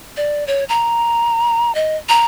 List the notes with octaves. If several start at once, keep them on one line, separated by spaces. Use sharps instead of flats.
D5
C#5
A#5
D#5
A#5